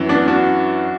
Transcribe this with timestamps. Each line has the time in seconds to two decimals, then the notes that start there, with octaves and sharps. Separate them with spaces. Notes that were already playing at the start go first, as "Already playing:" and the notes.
Already playing: F#2 E3
0.09 B3 D4
0.28 D4 F#4